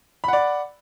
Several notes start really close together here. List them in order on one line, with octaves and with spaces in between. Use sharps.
B5 F#5 D5